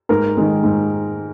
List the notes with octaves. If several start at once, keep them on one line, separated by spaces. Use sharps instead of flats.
G#2 A#4
D#3 G#3
G#2